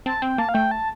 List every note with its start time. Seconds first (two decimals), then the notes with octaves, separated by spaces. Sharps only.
0.06 C4 A5
0.22 C4 G5
0.38 A#3 A5
0.49 F5
0.54 A3 G5
0.71 A5